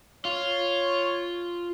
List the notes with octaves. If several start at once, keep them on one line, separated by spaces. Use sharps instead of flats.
F4 C#5